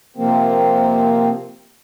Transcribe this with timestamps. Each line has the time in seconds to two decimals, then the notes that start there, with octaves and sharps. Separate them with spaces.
0.17 C3 F3 A#3 C4